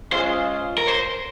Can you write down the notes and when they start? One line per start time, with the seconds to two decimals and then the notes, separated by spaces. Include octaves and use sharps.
0.12 G#3 C#4 F4 G#4 C5
0.78 A#4
0.87 C5